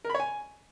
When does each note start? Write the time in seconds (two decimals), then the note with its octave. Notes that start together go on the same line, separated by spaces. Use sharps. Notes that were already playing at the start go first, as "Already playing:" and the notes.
0.05 A#4
0.10 B5
0.15 C#5
0.20 G#5